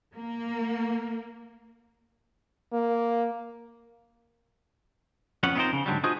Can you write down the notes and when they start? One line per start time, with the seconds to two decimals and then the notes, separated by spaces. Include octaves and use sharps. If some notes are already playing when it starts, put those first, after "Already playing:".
0.16 A#3
2.73 A#3
5.43 F2 B3 C#4 F#5
5.56 B3 C4 D#4 F4 A#4 C5
5.73 C#3
5.86 G#2 D3 F#3 G3
6.03 D4 F4 F#4 G#4 C5 D#5